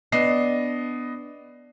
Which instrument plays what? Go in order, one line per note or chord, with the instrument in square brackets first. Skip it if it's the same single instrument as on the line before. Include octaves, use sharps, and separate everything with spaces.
[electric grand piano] B3 D#5 C7 [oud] D4